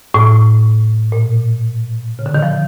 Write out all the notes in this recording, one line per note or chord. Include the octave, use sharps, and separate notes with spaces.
A2
A#2
C#3
D3
D#3
F3